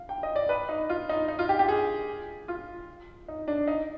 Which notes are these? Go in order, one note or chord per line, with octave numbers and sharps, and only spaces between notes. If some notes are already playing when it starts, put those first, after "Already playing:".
Already playing: F5
G5
D#5
D5
B4
D#4
F4
D#4
D#4
F4
G4
G4
G#4
F4
D#4
D4
D#4